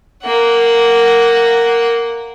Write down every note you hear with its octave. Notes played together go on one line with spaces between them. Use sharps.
A#3 F#5